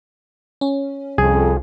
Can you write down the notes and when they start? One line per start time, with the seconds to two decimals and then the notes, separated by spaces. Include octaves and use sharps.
0.61 C#4
1.18 C2 F2 G#4